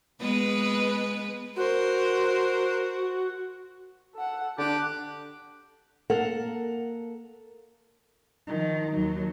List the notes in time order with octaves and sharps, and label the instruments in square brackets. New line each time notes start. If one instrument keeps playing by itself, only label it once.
[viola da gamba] G#3 B3 B4
[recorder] F#4 [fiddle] A#4 C5
[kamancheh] A4 F#5
[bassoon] D3 [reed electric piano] D4 A5 [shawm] G4 [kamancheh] F#6
[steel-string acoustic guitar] A#3 A4 A#4 F#5
[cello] D#3 F3
D#2 F#3